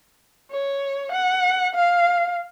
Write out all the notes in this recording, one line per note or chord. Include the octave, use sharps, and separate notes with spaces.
C#5
F#5
F5